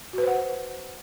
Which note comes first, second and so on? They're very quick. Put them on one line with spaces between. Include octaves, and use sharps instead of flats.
F#4 B4 C5 F#5